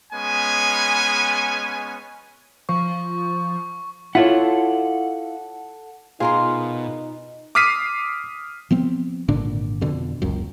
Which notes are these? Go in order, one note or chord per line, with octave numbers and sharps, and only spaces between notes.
G#3 B3 C#4 G#5
F3 C#6
E4 F4 A4 C#5 F#5
B2 D#4 F4 G#4 A#4 C6
D6 D#6 F6 B6 C7 D#7
F3 B3 C4
G#1 A#2 D3 D4
F2 B2 D3
F#1 C#2 F#2